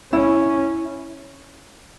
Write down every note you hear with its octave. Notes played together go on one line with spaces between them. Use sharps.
C#4 E4